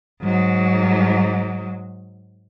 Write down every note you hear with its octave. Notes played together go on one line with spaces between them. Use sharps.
G#2 F#3